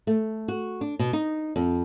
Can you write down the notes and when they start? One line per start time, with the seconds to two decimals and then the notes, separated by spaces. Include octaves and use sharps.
0.07 A3
0.48 F#4
0.81 D4
0.99 B2
1.13 D#4
1.56 F2